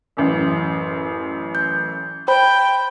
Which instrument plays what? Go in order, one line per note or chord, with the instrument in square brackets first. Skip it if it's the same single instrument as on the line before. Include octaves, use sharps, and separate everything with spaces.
[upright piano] A1 F#2
[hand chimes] G6
[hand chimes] C5 B5 [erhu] G5